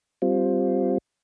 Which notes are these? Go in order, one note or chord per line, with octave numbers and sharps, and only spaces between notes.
G3 C4 F4